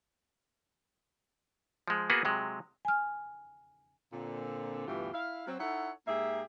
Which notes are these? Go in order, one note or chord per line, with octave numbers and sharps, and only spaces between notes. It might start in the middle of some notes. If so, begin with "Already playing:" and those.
F3 G#3
A#3 B3 F#4 G#4 B4
C3 F#3 G#3
G#5 F6
A#2 D3 C4
D2 G2 B2 E3 F4 G4
E4 F5
F#3 C4
D#4 E4 A4 C#5 F#5
G#2 A#3 G4 G#4 E5